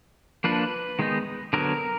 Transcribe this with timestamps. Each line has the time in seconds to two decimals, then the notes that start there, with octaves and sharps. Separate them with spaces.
0.44 F3 A#3 D4 B4
0.99 D#3 G#3 B3 D#4
1.53 D3 F#3 B3 A#4